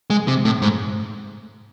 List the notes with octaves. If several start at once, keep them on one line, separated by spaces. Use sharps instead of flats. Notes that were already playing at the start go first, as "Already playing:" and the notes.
G#3
C3
A2
G#2